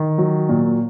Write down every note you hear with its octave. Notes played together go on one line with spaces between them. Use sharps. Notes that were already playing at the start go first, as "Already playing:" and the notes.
Already playing: D#3
F#3
A#2